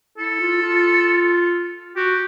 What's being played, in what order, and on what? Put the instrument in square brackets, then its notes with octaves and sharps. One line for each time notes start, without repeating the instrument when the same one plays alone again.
[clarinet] E4 [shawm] A4
[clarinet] F4
F4
[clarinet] F#4 [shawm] G4